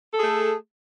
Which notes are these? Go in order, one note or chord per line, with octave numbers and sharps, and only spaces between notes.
A3 G#4 A4